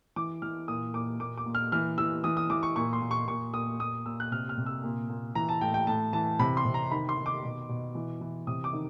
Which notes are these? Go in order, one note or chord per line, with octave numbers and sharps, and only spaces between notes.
E3 D6
E3 F6
A#2 D#6
A#2 D6
A#2 D6
D6
A#2
F6
E3 F6
E3 E6
E3 D#6
D#6
E3 D6
C#6
A#2 C#6
C6
A#2
C#6
A#2 C#6
A#2 D#6
A#2 D#6
A#2 E6
F#6
C3 F6
F6
C3
E6
A#2
A#2
E3 A#5
A5
A2 G5
G5
A2 A5
E3 A5
C3 B5
C6
C3
A#5
D#3 B5
C6
D#3
D6
B2
B2
E3
E3
C3 D#6
D6
D#3